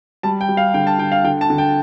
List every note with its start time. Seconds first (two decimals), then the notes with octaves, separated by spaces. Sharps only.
0.23 G3 A5
0.41 G5
0.49 G3
0.57 F5
0.74 D3 G5
0.87 A5
0.99 D3 G5
1.12 F5
1.24 D3 G5
1.41 A5
1.50 D3
1.58 G5